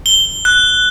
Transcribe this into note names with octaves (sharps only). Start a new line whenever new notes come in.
G7
F#6